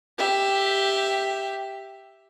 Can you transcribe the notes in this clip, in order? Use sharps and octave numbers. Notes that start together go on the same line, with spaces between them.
G4 E5